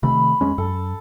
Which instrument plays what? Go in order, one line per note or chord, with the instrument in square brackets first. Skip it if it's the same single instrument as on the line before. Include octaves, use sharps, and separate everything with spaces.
[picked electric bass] C3 D#3 A3 [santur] B5
[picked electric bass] F2 G#3 C#4
[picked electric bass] F#2 [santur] A4